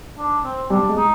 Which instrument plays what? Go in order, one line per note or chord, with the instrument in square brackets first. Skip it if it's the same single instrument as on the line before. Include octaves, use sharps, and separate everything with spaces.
[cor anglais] D4
C4
[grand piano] G3 [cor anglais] D4
[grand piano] G#3
[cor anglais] D#4